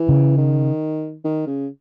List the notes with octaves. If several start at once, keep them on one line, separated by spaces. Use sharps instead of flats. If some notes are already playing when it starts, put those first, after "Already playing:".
Already playing: E3
C#3
D#3
D#3
C#3